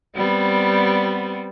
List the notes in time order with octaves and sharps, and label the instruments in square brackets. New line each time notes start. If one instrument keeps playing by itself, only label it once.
[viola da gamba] G3 B3 C4